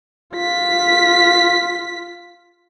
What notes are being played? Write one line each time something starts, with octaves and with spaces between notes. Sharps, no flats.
F4 B6